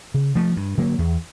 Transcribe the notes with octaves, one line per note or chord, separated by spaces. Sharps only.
C#3
F3 A3
G2
D3 F#3 A#3
E2